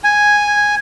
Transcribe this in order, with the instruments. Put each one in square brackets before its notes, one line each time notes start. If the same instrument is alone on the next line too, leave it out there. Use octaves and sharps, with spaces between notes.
[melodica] G#5